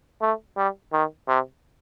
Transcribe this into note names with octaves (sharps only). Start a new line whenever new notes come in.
A3
G3
D#3
C3